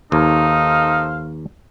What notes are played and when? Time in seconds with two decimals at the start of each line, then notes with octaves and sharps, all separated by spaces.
0.12 D#2 D#4 A4 C5 F5